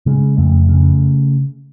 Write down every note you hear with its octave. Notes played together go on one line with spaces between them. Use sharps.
C#3 G#3
F2 A3
C#3